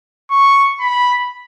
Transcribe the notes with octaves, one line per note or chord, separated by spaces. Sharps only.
C#6
B5